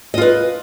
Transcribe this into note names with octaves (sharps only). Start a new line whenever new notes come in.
F4 B4 D#5